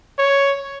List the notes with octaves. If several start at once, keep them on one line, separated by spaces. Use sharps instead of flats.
C#5